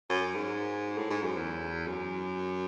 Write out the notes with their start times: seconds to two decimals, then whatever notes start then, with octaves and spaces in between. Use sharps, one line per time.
0.09 F#2
0.35 G#2
0.98 A2
1.10 G#2
1.23 F#2
1.36 E2
1.87 F#2